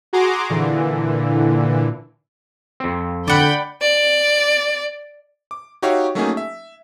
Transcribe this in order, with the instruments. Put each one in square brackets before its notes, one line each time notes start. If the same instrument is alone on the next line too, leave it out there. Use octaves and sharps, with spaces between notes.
[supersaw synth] F#4 G#4 A#5 C6 D6
A#2 D3 E3
[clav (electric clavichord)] F2 C4
[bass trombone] D3 [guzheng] D5 F#5 [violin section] G5 B5 G6
[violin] D5
[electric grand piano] D6
D#4 F#4 G4 C#5 E5 F5
F#3 A3 A#3 C#4 D#4 G#4
E5